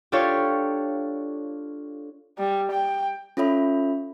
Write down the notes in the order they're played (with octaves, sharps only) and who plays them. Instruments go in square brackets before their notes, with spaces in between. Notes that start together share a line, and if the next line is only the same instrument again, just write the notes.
[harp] D4 F4 G4 A4 C#5
[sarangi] G3
G5
[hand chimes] C#4 F4 A4 C#5 E5 B5